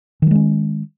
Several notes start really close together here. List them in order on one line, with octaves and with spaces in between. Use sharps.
D#3 F#3 G#3 C#4